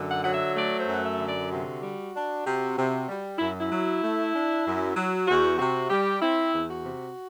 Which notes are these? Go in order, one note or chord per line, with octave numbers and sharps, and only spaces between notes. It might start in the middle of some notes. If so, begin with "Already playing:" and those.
Already playing: F#2 D3
F#5
F#3 F#5
E5
A3 D5
C5
F#2
F#5
E5
D3
D5
C3 F#4
G3
D4
C3
C3
G3
F#2 E4
E4
F#3
A3
D4
F#2
F#3
E2 F#4
C3 F#4
G3 G4
C4 E4
E2
F#4
C3